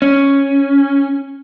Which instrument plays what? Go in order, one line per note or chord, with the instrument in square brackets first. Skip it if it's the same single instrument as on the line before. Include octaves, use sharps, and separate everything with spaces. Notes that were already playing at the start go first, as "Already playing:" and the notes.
[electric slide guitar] C#4